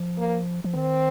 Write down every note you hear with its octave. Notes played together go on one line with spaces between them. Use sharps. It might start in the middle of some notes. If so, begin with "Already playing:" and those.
Already playing: F3
A#3
F3
D#3 C4